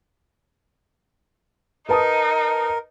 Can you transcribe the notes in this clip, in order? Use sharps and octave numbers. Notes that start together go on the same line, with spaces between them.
D#4 A#4 B4 A5 D#6